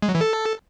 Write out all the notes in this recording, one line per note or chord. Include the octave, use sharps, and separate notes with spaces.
G#3
F#3
E3
A4